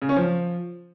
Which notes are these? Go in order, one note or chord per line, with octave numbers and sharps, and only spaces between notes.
C#3
C#4
F3